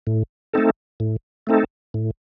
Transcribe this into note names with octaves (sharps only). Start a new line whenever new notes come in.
A2
A3 C4 D#4 A4
A2
A3 C4 D#4 A4
A2